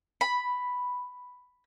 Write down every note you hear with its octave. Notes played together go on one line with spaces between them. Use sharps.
B5